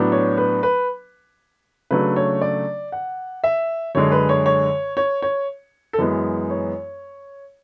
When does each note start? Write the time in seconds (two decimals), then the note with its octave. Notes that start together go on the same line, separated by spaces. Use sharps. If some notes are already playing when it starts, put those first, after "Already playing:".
Already playing: A2 F#3 B3 D4
0.12 C#5
0.38 B4
0.63 B4
1.91 C#3 F#3 A3 D4 B4
2.16 C#5
2.42 D5
2.92 F#5
3.44 E5
3.95 F#2 D3 G#3 C#5
4.12 B4
4.29 C#5
4.46 C#5
4.97 C#5
5.22 C#5
5.93 A4
5.98 F#2 E3 G#3 B3 B4
6.50 C#5